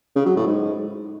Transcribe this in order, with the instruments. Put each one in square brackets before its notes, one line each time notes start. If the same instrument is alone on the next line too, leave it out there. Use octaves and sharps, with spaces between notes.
[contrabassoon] C#3
F#3
A2
G#2